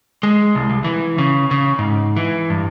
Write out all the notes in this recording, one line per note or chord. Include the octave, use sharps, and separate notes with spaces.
G#3
C2
C2
E3
C#3
C#3
G#2
E3
G2